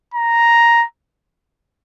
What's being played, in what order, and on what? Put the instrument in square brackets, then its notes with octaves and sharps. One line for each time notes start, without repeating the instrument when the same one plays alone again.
[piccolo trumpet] A#5